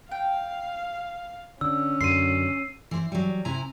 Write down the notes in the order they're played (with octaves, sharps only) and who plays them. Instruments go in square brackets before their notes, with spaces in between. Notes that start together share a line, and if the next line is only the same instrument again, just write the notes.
[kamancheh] F5 [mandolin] G5
[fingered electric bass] D3 [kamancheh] C#4 [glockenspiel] E6
[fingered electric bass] F#2 D3 F#3 [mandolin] C6 [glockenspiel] C7 D#7
[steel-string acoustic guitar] E3 C5
F#3 G3
C3 E4 G#5 A#5